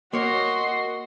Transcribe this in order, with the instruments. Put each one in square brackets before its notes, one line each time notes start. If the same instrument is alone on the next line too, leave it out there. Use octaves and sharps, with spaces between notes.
[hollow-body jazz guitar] A#3 C#5 [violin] F#4 [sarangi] D#5 [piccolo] C6